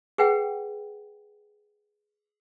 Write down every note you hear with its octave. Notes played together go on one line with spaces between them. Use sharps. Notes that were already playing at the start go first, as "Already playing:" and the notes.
G#4 B4 F#5 G5